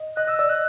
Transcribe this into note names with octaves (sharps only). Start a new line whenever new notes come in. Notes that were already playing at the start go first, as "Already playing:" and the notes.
Already playing: D#5
D#5 F#6
D#5 E6
D5 E6
D#5 F#6